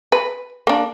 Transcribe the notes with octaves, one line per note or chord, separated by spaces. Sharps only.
B4
A#3 D4